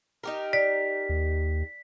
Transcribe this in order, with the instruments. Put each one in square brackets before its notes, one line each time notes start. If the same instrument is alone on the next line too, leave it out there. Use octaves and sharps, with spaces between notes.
[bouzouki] D#4 G4 A#4
[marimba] D5 [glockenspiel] B6
[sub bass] D#2